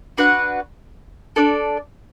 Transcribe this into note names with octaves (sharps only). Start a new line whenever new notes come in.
D4 F#4 B4 F#5
D4 A4 D5